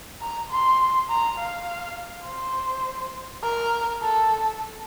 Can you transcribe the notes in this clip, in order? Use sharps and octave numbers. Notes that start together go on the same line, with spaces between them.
A#5
C6
A#5
F5
C5
A#4
A4